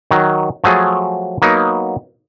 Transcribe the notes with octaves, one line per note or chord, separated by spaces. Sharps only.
D#3 F#3
F3 F#3 A3 G#4
F#3 A#3 B3 D#4